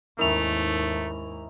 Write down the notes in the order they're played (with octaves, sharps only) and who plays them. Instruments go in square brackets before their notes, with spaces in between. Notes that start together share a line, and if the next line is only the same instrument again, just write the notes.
[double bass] D#2 G#2 [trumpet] A3 [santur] C#4 D#4 E4 [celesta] A#4 F7